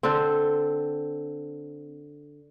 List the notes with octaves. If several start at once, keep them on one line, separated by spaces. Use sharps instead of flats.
D3 C4